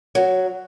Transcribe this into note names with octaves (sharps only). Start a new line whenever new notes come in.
F#3